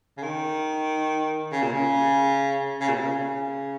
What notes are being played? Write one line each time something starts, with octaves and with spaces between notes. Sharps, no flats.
C#3
D#3
C#3
A#2
C#3
C#3
A#2
C#3